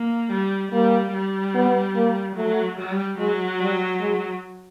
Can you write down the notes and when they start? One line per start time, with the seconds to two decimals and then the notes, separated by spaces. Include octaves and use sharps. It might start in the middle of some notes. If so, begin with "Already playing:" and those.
Already playing: A#3
0.31 G3
0.72 G3 A#3
1.14 G3
1.55 B3
1.95 A#3
2.36 F#3 A3
2.78 G3
3.18 F#3 G#3
3.60 G3
4.01 G#3